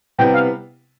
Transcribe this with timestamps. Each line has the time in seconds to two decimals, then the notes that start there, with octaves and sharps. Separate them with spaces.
0.18 C3 G3 B3 E4 G5
0.34 F5